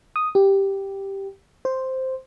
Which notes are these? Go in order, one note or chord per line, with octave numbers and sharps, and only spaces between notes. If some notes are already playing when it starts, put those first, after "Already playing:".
D#6
G4
C5